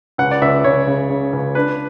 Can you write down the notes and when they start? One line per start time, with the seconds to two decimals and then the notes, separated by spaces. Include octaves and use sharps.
0.18 C#2 F#5
0.31 D5
0.41 C#2 E5
0.64 C#2 C#5
0.87 C#3
1.10 C#3
1.33 C#2
1.55 D4 B4